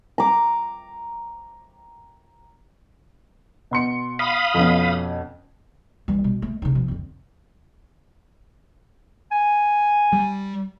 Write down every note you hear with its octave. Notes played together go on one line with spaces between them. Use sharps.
A#5 D6
B2 C6 C#7
F5 B5 D#6
F2 B2 C#4
E3 G3
B2
A3
C#3 D#4
B2 F3
F2 D3
G#5
G3